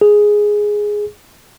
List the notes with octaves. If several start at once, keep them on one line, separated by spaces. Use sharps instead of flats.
G#4